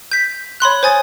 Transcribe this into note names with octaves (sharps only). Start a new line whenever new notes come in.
G6 B6
C#5 B5 C6 F#6
C5 C#5 G#5 D#6 A6